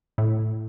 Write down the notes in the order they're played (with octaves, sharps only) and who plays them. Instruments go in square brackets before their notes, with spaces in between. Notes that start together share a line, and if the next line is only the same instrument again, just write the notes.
[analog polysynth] A2